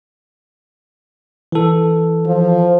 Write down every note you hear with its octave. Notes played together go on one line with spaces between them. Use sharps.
E3 A4
F3